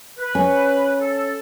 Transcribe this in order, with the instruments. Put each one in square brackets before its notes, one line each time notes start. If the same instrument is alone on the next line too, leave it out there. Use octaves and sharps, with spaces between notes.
[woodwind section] B4
[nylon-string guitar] C#4
[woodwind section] A4